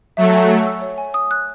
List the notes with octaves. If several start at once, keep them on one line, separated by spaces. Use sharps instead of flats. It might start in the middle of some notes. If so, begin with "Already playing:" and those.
F#3 A3 E5
G#5
C#6
E6
C#5
G#5
D#6
F#6